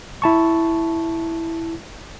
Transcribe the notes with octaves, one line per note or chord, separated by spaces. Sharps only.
E4 A5 C#6